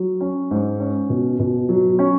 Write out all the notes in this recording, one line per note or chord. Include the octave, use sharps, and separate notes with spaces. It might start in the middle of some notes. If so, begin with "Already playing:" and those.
Already playing: F#3
C#4
G#2
C#4
B2
B2
F#3
C#4